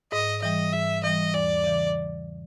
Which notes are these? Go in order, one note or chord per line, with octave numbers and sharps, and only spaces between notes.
G#2 D#5
E3 G3 D#5
G#2 E5
E3 G3 D#5
E2 D5
C#3 E3